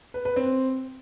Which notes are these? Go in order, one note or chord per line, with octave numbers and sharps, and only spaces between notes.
B4
B4
C4